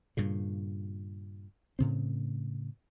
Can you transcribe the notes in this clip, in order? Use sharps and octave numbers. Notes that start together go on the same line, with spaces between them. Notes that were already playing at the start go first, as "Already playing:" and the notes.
G2 A#2 C#3
A2 C#3 C4